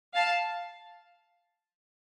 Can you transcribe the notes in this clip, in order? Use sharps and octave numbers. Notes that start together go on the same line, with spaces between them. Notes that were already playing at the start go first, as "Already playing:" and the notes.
F5 A5